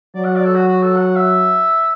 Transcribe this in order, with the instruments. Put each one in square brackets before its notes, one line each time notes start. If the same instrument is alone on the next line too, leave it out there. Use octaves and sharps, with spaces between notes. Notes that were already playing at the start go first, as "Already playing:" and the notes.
[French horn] F#3 [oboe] D5
[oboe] F#5
D5
A4
F#4
F#4
A4
F#5
E5